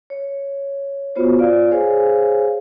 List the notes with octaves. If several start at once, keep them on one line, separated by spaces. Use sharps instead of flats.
C#5
B3 F4 F#4 C5 C#5
F4 D5 F5
G#4 C5 C#5 F5 G#5